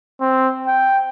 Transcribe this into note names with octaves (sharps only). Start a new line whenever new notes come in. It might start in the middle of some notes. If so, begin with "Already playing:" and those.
C4
G5